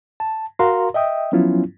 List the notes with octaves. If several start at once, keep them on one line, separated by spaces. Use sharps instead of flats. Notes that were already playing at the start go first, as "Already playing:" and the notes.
A5
F#4 A#4 F5 A#5 C6
D#5 E5 G5 D#6
F3 F#3 B3 C#4 E4 F4